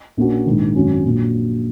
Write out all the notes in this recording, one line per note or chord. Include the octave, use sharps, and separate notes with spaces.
A#1 A#2 A#3 C#4 F#4
A#1 G#2 D#3
G#1 F#2 F#3 C#4
A#1 A#2 F#3